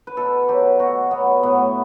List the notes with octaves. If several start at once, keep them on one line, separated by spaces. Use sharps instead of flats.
B4
B2 A4
F#3 G4
B2 F#4
F#3 B3
A2 B3